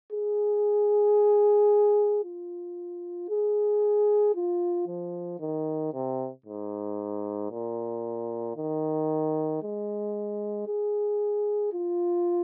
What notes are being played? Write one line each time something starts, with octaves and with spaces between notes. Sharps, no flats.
G#4
F4
G#4
F4
F3
D#3
C3
G#2
A#2
D#3
G#3
G#4
F4